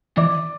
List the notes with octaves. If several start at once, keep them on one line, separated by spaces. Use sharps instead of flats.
E3 D5 D6